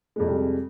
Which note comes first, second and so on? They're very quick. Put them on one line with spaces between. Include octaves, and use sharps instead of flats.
G#3 F2 C3 G3